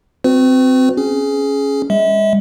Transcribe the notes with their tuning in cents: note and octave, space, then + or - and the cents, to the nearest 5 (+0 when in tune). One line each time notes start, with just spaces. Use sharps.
C4 -15 F#4 -20 B4 +45
C#4 +0 G#4 +15
G#3 -40 E5 -35